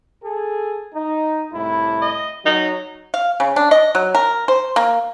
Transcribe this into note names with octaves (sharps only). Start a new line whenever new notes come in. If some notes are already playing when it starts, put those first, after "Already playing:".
G#4 A4
D#4
C2 A2 E4
D#5
F#3 D#4
F5
C#3
D4
D#5
F#3
A#4
C5
A#3